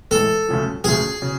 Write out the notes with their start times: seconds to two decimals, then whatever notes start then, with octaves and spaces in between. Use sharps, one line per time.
0.11 A2 E3 G#3 A4
0.48 D2 C#3 F3
0.84 D2 C#3 F3 G#4
1.22 C#3 F#3